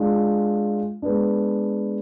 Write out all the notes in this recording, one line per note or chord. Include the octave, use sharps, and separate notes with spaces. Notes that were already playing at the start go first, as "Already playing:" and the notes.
Already playing: G#3 D4 F4
G#3 B3 D4